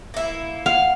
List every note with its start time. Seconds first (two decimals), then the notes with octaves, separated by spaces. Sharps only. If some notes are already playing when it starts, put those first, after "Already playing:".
0.14 A#3 E4
0.66 F5 F#5